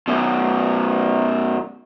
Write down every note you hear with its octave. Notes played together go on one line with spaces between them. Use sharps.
F#2 B2